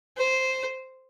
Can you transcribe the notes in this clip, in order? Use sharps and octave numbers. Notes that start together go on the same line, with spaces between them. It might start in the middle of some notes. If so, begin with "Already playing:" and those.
C5